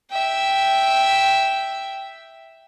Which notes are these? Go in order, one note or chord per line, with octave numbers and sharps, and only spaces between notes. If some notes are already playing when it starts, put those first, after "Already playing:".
E5 G5